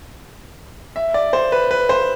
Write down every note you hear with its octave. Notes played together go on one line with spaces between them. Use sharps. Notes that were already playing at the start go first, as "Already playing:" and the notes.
E5
D5
C5
B4
B4
C5